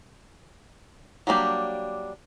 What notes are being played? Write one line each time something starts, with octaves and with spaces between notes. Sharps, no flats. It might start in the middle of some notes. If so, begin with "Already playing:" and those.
F#3 G3 A#3 D4 G4